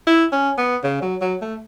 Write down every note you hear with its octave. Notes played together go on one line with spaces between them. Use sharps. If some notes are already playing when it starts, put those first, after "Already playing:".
E4
C#4
B3
C#3
F#3
F#3
A3